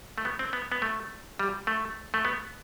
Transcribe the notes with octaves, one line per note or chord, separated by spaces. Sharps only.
A3
B3
C4
B3
B3
A3
G3
A3
A3
B3